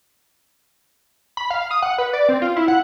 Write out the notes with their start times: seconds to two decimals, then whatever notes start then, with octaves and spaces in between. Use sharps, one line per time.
1.37 B5
1.50 F5
1.71 D#6
1.82 F#5
1.98 B4
2.13 D5
2.29 C4
2.42 F4
2.56 E4
2.68 F#5